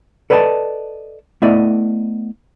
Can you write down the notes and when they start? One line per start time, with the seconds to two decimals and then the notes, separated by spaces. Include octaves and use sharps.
0.30 A4 B4 D5 D#5 F5 A5
1.42 A3 B3 E4 D5 D#5